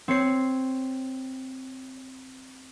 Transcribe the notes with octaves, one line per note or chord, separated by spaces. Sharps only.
C4 C#5 C7